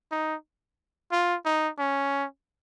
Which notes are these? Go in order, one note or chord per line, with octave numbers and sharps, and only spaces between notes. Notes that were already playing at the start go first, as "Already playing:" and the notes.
D#4
F4
D#4
C#4